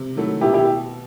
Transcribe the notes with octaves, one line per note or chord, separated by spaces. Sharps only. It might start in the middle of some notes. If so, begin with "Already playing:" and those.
Already playing: C3
D#3 F#3 A3 E4
B2 E4 G4
E4 G4